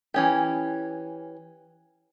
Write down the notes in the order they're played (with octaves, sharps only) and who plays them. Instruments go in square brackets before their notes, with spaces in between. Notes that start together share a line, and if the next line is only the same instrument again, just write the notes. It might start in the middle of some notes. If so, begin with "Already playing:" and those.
[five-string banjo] E3 C#4 G4